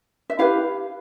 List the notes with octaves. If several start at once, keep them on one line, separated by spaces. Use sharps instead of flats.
E5
E4 G4 B4 F5